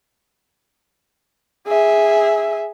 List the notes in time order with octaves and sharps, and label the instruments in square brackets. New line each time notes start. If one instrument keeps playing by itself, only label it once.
[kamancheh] G#4 E5